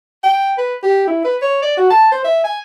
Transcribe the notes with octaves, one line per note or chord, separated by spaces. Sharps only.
G5
B4
G4
E4
B4
C#5
D5
F#4
A5
C5
E5
G#5